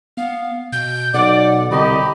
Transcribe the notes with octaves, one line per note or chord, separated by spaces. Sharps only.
B3 F5
B2 G6
B1 B2 D5 F#5
C2 D3 G4 D#5 A#5 B5